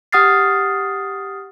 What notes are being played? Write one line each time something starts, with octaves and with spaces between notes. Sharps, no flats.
G4 F#5 D#6 F6 A6 C7